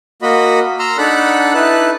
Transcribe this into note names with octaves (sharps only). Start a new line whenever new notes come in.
A#3 F#4 D#5 B5
A#5 C6 E6 F6
D4 D#4 A4 F#5 B5 F#6
D#4 E4 B4 A5 F#6